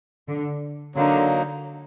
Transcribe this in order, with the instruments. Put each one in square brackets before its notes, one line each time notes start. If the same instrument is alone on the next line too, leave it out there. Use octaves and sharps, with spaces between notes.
[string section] D3
[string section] D3 [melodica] F#3 A#3 D#4